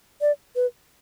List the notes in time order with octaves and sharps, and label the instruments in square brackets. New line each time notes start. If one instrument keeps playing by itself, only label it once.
[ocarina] D5
B4